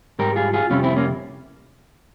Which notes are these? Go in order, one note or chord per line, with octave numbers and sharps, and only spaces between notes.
G#2 G3 G4 A#4
F4 G#4
F4 G#4
F2 C3 G3 C#4 F4
C4 E4
A#3 C#4